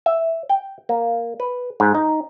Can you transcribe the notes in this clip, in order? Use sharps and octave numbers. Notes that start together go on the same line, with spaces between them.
E5
G5
A#3
B4
G#2
D#4